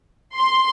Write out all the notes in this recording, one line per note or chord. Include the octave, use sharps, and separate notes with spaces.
C6